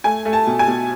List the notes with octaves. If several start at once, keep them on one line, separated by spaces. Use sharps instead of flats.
A3 G#5
A3
A5
B2
G#5
B2